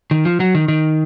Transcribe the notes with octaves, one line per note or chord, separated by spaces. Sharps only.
D#3
F3
F#3
D#3
D#3